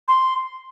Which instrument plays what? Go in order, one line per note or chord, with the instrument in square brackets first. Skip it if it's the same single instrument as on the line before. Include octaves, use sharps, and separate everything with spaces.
[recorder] C6